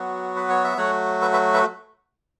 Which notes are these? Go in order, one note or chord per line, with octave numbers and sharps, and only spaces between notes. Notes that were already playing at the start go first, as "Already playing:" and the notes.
Already playing: F#3 B3 F#4
B4
C#5
E5
F#3 A3 F#4 C#5 F#5
B4 E5
B4 E5
B4 E5